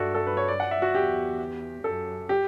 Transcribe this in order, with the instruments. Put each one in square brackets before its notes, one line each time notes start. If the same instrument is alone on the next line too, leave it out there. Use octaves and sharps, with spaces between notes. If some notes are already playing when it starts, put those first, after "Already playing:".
Already playing: [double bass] G2 [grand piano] F#4 A4 D5 E5
[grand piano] A4
B4
C#5
D5
F#5
E5
F#4
[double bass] E2 [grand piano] G4
[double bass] F#2 [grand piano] A4
[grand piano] G4